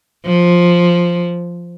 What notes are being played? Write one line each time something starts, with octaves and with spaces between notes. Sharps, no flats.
F3